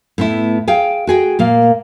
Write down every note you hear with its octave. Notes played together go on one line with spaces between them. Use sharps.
A2 B3 E4
G#4 F5 G5
F#4 G#4 G5
A#2 A#3 F5